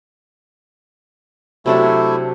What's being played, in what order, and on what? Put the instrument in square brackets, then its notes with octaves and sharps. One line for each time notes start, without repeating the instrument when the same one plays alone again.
[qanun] C3 F#3 D4 [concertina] A3 E4